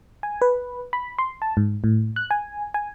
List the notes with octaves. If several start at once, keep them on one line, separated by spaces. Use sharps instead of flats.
G#5
B4
B5
C6
A5
G#2
A2
F#6
G#5
G#5